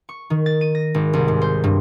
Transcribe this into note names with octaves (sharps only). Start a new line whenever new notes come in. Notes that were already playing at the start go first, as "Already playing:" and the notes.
C#6
D#3
A6
D#7
A#6
G#1
C2
G#2
C5
G2